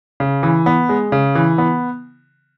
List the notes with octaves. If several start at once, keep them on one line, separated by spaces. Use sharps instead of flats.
C#3
E3
B3
G#3
C#3
E3
B3